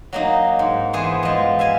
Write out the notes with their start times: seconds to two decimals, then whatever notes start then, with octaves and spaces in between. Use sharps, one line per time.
0.13 F#3 A#3 D#4
0.59 G#2
0.93 E3 B3 G#4 C5 G#5
1.23 F3 G#3
1.59 E5 F5 G#5